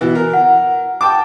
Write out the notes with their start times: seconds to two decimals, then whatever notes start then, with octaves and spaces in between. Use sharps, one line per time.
0.01 B2 E3
0.15 A#4
0.33 F#5
1.01 G5 A5 D6